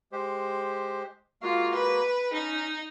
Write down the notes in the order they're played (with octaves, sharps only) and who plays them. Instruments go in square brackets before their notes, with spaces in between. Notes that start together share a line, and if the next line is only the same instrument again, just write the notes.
[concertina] G#3 G4 C5
[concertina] G#3 A#3 F#4 [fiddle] F4
[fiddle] B4
[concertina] C#4 [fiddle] D#4